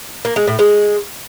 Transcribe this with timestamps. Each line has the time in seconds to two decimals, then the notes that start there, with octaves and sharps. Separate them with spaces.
0.25 A#3
0.36 G#3
0.47 A2
0.59 G#3